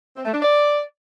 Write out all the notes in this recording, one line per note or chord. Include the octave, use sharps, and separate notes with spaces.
C4
A3
D4
D5